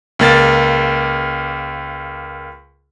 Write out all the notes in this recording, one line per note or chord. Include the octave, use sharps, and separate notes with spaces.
C#2 A#3 A6